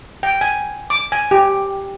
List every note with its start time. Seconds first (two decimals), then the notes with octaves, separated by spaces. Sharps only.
0.23 G5
0.41 G#5
0.90 D6
1.12 G#5
1.31 G4